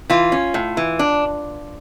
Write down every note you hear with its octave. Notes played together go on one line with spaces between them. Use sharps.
E3 F4
C#4
A2
E3
D4